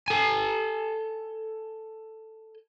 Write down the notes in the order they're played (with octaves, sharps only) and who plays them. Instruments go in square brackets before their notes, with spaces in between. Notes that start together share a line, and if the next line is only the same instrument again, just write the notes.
[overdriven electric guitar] A4 G#5